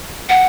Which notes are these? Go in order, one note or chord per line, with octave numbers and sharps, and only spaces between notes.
F#5